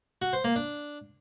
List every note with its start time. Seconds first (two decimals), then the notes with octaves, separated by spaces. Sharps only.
0.22 F#4
0.33 C5
0.44 A#3
0.56 D4